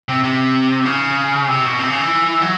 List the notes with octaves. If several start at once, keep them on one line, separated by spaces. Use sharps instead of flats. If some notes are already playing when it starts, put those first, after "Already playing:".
C3
C3
C#3
C3
B2
C3
C#3
E3
F#3